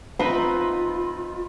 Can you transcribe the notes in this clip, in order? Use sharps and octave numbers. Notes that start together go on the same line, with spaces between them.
C4 D#4 F4 B4 B5